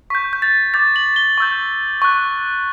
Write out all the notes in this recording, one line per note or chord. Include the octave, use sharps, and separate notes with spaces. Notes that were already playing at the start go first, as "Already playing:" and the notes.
C#6 G6 B6
G6
A6
D6 G6 A6
F#7
G7
C#6 E6 G6
C#6 F#6